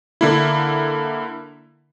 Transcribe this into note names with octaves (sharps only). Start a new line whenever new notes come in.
D3 A#3 E4